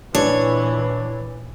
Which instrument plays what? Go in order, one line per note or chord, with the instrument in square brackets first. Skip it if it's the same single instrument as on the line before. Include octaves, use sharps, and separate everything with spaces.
[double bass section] A#1 E3 [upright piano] D4 [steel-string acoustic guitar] C#5